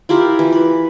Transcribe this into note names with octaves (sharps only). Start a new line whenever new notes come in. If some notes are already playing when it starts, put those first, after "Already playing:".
E4 F4 G4 A#4
E3
B4